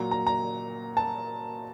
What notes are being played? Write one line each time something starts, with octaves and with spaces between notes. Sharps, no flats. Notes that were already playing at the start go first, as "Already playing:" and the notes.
Already playing: A#2 F#3 A#5
A#5
A#5
A5